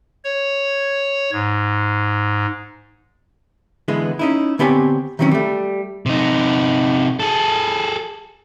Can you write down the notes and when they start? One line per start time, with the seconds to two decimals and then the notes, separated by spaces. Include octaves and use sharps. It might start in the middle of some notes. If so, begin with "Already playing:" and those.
0.24 C#5
1.32 G#2
3.88 D3 E3 G#3 B3
4.19 C#4 D#4 E4
4.59 D3 B3 C4 G4 C#5 G#5
5.19 D#3 E3 F#3 C4 C#4
5.31 G3 A3
6.06 C3 D#4
7.20 G#4 A4